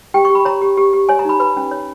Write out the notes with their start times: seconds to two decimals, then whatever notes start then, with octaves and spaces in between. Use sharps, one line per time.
0.14 G4 G5
0.25 C#6
0.30 G4
0.35 B5
0.45 C#5 A#5
0.62 G4
0.77 G4
0.93 G4
1.09 C#5 G#5
1.19 A#5
1.25 D#4 B5
1.40 B4 B5
1.57 C#4
1.71 C#5